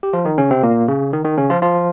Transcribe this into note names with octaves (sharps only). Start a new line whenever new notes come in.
G4
F3 F4
D#3 D#4
C#3 C#4
C3 C4
A#2 A#3
C#3
D#3
D#3
C#3 C#4
F3 F4
F3 F4